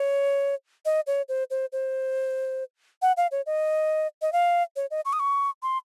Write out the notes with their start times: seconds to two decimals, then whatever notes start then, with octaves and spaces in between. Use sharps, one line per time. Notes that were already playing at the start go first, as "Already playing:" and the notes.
Already playing: C#5
0.85 D#5
1.07 C#5
1.28 C5
1.50 C5
1.72 C5
3.02 F#5
3.17 F5
3.31 C#5
3.46 D#5
4.22 D#5
4.32 F5
4.76 C#5
4.91 D#5
5.05 C#6
5.13 D#6
5.20 C#6
5.63 C6